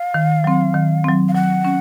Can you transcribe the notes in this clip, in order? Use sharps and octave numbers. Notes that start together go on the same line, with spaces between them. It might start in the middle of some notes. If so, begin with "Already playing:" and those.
Already playing: F5
D#3
F#3 C4
D#3
F#3 C4
F5
F#3 F#5
C#4